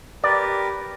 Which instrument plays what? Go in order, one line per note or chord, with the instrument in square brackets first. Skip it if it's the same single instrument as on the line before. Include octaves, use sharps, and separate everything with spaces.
[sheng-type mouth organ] G4 A#4 B4 [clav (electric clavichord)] D5